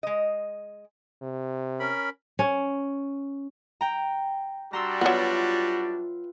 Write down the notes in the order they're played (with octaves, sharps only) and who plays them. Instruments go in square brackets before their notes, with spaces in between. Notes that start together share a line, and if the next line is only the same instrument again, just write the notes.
[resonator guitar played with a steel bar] G#3 D#5
[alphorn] C3
[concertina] C#4 A#4 B5
[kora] C#4
[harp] G5 A#5
[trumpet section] G3 D4 F#4 [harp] A#5 C6 E6
[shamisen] F#3 B3 [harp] F4 B4 E5